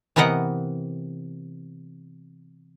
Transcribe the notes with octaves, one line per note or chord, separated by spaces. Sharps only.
C3 E3 B3 A#4 D#5 F#5